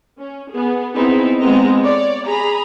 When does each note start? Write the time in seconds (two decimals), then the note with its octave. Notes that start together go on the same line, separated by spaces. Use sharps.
0.19 C#4
0.52 B3 G#4
0.94 B3 C4 D#4 E4 G#4
1.40 G#3 B3 C4 D#5 A#5
1.81 C#5 D5
2.26 G#4 A#5 B5